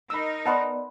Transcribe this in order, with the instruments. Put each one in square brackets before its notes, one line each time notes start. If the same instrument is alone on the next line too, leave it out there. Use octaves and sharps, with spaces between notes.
[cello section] D#4 A#4 [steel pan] B5 E6
[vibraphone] B3 D5 [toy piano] B4 B5 C6 [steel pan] D#5 F#5 A5